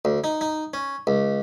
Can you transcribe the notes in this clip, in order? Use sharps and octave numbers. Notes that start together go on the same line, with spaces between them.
D2
D#4
D#4
C#4
C#2